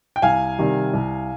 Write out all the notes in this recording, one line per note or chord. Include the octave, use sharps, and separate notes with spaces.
G5
C2 F5 G#5
C3 D#3 G3
C2